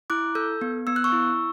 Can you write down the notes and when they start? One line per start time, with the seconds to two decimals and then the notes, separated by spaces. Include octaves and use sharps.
0.10 E4 D6 F#6
0.35 A4 E6 G6
0.61 B3
0.87 B3 E6
0.96 F#6
1.04 C#6 E6
1.12 E4